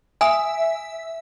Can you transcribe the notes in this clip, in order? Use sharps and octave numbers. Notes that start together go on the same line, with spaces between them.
E5 G#5 D#6